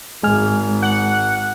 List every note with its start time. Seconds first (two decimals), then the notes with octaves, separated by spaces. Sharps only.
0.23 G#1 G#3 G#5 F6
0.82 F#5